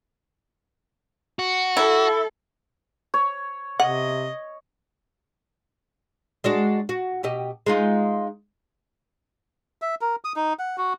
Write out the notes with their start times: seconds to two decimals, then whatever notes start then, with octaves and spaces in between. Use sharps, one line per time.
1.39 F#4
1.77 E4 A4
3.14 C#5
3.80 C3 D#5 F#5
6.44 G#3 D4 F#4
6.89 F#4
7.23 B2 G4 D#5
7.66 G#3 D#4 F4
9.82 E5
10.01 A#4
10.25 D#6
10.36 D#4
10.59 F#5
10.78 F#4